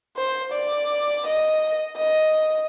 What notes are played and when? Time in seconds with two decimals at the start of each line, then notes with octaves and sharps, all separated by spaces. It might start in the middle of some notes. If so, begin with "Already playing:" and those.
0.17 C5
0.52 D5
1.27 D#5
1.97 D#5